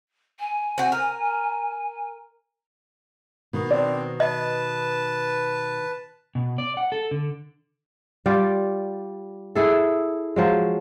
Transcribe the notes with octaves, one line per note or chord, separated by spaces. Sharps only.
G#5
C4 F#4
A#4
B2 D#3
C4 D4 D5
B4 D#5 A5
B2
D5
F#5
A4
D3
G3 F4 G4 D5
E4 G#4 A4
F3 F#3 G#3